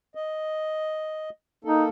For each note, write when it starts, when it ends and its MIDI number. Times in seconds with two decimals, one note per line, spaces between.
0.15 1.30 75
1.65 1.89 58
1.65 1.85 63
1.65 1.89 69